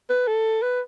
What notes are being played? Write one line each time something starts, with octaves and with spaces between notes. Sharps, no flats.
B4
A4
B4